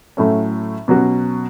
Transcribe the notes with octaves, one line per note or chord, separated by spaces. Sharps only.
A2 F#3 A3 C#4
B2 F#3 C#4 F#4